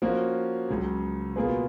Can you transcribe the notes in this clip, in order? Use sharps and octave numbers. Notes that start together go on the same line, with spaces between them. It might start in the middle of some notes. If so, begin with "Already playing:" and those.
F3 A#3 C#4 F#4
C#2 C#3 F#3
B2 A#3 F4 G#4 B4